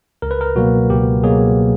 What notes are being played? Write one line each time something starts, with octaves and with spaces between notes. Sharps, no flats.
C#2 A#4
B4
A#4
B2 F#3 A#3 F#4
C#2 G4
B2 F#3 A#3 G#4